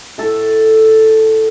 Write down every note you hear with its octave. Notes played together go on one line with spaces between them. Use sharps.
A2 A3 A4